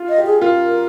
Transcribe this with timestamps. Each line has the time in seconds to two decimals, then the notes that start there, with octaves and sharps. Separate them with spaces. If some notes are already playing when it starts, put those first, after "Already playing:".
Already playing: F4
0.09 D#5
0.18 G4
0.26 G#4
0.41 F4 A#4